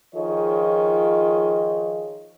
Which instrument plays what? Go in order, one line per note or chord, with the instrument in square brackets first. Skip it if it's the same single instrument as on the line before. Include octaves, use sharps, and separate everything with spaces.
[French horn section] D#3 F3 F4 G#4 C#5 D#5